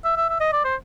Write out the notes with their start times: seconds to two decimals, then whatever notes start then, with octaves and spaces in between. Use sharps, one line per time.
0.05 E5
0.17 E5
0.29 E5
0.40 D#5
0.53 D5
0.65 C5